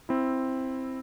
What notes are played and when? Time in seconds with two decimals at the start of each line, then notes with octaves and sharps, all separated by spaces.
0.09 C4 E4